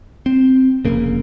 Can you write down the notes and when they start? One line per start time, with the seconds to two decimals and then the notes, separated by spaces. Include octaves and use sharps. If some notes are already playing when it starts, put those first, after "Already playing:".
0.26 C4
0.85 F1 F2 C#3 A#3